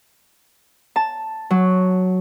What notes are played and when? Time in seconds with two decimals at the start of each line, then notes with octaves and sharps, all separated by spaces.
0.96 A5
1.50 F#3